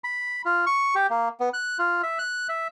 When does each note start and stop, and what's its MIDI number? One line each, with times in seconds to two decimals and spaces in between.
0.04 0.42 83
0.45 0.65 65
0.66 0.95 85
0.95 1.07 67
1.10 1.29 58
1.40 1.49 59
1.53 1.78 90
1.79 2.02 65
2.03 2.19 76
2.19 2.47 90
2.49 2.68 76